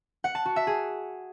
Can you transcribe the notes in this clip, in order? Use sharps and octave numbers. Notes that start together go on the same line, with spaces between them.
F#5
A5
F#4
E5
G#4